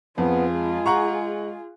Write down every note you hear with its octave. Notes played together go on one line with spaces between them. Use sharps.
F2 B3 F4 G#4
G#3
F#5 A#5 C#6